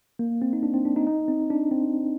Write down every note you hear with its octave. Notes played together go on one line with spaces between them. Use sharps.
A#3
C4
D#4
D4
C4
D4
D#4
D#4
C4
D4
C4